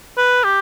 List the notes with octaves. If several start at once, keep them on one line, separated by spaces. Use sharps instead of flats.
B4
G4